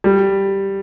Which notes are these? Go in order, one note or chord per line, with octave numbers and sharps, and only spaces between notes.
G3